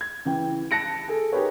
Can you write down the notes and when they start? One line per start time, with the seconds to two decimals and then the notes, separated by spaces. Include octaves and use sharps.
0.01 G#6
0.25 C#3 E3 G5
0.71 A5 F#6 A#6 C#7 D7
1.08 G#4 A4
1.32 D#4 G4 G#4 A#4 B4 C#5